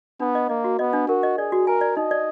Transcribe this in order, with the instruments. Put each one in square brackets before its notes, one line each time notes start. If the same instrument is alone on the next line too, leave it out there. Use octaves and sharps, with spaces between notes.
[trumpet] B3 [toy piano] D4
[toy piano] D#5
[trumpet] A#3 [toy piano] D#5
[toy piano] F#4
[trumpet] B3 [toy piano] D#5
[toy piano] D4
[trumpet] F#4 [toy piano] A#4
[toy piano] D#5
[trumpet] G#4 [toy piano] D5
[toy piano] F#4
[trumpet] A#4 [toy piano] G#5
[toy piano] D5
[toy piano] D#4 [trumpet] D#5
[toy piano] D5